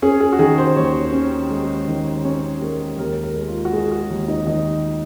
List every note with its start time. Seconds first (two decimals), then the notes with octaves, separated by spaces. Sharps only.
0.02 C#4 G#4
0.21 G#4
0.33 F#4
0.39 D#3 G#4
0.58 C5
0.76 D#2 C#5
1.13 C#4
1.50 G#3
1.88 D#3
2.25 C#4 C#5
2.61 G#3 A#4
2.98 D#2 A#4
3.23 A#4
3.36 G#3
3.48 F4
3.65 F#4
3.73 G#3 G#4
3.87 G#4
3.91 F#4
4.10 D#2
4.28 D#4
4.47 D#3 D#4